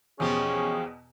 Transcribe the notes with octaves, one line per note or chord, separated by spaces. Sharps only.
E2 B2 F3 C#4 G4 G#4